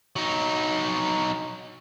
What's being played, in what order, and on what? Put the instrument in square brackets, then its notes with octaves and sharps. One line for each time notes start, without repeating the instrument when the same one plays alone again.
[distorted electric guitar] F#3 D#4